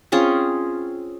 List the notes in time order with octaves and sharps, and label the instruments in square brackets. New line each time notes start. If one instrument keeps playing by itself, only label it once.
[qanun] C4 C#4 F4 G#4